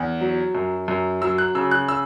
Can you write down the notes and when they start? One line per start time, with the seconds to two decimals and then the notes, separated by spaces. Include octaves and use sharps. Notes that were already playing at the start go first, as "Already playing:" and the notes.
Already playing: E2
0.21 F#3
0.55 F#2
0.88 F#2
1.22 F#3 E6
1.38 F#6
1.55 C#3 E6
1.71 F#6
1.89 E6